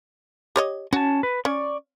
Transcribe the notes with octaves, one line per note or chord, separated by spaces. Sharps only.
G4 C#5 D#5
C#4 F#4 A5
B4
C#4 D5 C#6